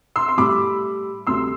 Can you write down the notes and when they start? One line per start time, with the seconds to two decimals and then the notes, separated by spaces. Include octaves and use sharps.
0.16 C6 E6
0.28 C6
0.38 A2 G3 B5 D6
1.27 D2 C3 G3 C6 E6